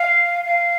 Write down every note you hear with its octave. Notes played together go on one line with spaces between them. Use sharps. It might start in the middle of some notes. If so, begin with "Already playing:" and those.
Already playing: F5
F5